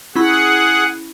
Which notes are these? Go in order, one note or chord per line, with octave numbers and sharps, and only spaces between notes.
C#4 E4 G#4 F#5 B5